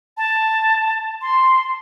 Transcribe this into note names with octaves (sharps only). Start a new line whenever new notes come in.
A5
C6